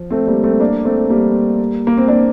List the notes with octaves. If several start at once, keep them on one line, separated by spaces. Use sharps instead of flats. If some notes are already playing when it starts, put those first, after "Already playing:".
Already playing: F3
A3 C4
G3 A#3
A3 C4
A#3 D4
A3 C4
G3 A#3
A#3
C4
A#3 D4